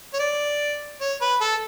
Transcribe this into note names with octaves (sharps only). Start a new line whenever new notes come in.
C#5
D5
C#5
B4
A4